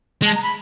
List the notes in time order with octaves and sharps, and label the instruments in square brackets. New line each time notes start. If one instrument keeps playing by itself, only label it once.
[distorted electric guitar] G#3 [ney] A5
[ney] A#5
B5